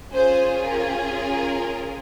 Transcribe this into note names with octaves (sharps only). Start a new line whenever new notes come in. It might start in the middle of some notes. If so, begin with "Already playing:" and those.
C#4 F4 G#4 C5
A#4
A#4